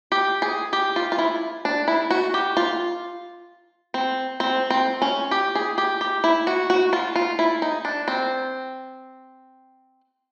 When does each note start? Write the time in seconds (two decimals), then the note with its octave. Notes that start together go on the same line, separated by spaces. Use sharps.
0.12 G4
0.42 G#4
0.73 G4
0.96 F4
1.12 F4
1.19 E4
1.65 D4
1.88 E4
2.10 F#4
2.34 G4
2.57 F4
3.94 C4
4.40 C4
4.70 C4
5.02 C#4
5.31 G4
5.55 G#4
5.78 G4
6.01 G4
6.24 E4
6.47 F#4
6.70 F#4
6.93 F4
7.16 F4
7.39 E4
7.62 D#4
7.85 D4
8.08 C4